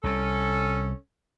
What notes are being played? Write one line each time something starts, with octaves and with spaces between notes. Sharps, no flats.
C2 C3 C#4 A4